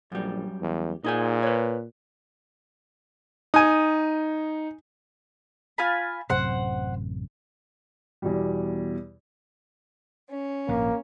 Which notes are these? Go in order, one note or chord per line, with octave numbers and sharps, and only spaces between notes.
A#1 F#2 G3
E2
A#2 D#4 G#4 G#5
B4 C#5
D#4 G#5 D#6
F4 G#5 B5
A1 F#2 C3 C5 F#5
E2 B2 G3
C#4
A#1 G#2 A#3